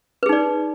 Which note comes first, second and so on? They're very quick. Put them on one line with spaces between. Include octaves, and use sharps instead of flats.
B4 G#4 D#4 D5